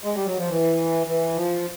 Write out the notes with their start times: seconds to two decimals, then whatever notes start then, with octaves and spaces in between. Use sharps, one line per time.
0.04 G#3
0.15 G3
0.26 F#3
0.38 F3
0.50 E3
1.07 E3
1.36 F3